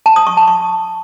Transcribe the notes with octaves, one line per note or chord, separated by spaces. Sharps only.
A5
D#6
C#6
A5
C#6